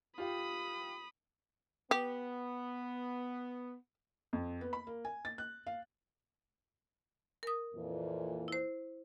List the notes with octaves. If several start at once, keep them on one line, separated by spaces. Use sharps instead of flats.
F4 G4 F5 B5 D#6
B3 G4
F2
B3
B5
A#3
G#5
A6
F#6
F5
A#4 D#6
F2 A#2 E3
E4 C5